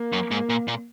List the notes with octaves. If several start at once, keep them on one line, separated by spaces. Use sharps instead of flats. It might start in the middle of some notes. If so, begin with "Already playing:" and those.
Already playing: A#3
F#2
G#2
A#2
A#2